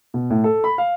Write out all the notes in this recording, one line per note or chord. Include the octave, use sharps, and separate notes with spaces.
B2
A2
A4
B5
F5